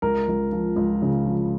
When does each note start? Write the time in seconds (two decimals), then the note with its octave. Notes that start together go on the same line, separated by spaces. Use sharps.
0.02 C#2 A#4
0.28 C#2
0.52 F3
0.76 C#2
1.02 C#3
1.26 F3